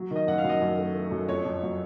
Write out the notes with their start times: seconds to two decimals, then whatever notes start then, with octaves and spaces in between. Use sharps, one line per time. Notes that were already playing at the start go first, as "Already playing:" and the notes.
Already playing: F#3
0.11 D#3 D#5
0.27 F#2 F#5
0.38 F5
0.44 F#2
0.49 D#5
0.61 F#2
0.78 A3
0.95 A3
1.11 F#2
1.28 F2 C#5
1.45 F2
1.63 F#3